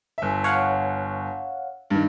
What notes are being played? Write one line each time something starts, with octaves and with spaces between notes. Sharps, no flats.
G1 E5
C#5 F5 F#5
G2 D#3